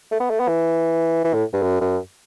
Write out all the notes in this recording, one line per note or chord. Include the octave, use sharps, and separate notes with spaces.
A3
B3
A3
B3
E3
E3
A2
G2
F#2
F#2